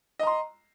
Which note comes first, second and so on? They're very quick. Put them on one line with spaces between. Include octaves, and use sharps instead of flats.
D#5 A#5 C6